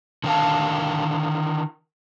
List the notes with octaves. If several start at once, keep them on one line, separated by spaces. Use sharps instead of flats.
D3 D#3 D4 A#4 F5 A5